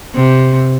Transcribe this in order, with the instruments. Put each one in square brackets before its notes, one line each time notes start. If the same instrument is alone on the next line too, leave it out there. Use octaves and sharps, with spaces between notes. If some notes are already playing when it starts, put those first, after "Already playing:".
[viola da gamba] C3